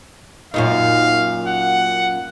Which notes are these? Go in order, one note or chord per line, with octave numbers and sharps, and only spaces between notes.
F#2 A#2 D#4 F5
F#5